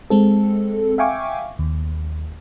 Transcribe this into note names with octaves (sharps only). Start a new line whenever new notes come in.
G#3 C4 A4
E5 F5 G5 G#5 C#6 D6
D#2